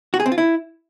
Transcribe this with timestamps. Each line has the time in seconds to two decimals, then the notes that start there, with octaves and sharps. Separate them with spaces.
0.14 F#4
0.20 G#4
0.26 C4
0.32 F4
0.38 E4